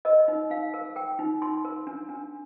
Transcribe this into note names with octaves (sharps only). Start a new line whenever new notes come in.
A#4 D#5
D#4
D#4 F5
A#4
A#4 G5
D#4
D#4 C6
A#4
D4
D4